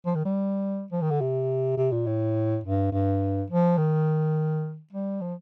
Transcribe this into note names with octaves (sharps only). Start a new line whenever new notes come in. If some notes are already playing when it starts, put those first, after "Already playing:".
F3
D#3
G3
F3
D#3
D3
C3
C3
A#2
A2
G2
G2
F3
D#3
G3
F3